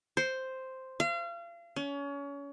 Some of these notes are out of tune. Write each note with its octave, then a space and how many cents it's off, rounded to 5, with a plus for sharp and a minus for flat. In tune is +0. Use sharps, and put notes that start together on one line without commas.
C5 +0
F5 -35
C#4 +30